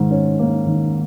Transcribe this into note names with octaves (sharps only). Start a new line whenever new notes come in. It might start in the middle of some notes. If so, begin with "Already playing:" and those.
Already playing: G#2 D#3
C#4
A#3
D#3